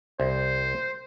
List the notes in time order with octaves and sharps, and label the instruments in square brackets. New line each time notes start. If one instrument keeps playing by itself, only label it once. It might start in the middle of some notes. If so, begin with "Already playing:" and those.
[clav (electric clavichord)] C2 [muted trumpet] C5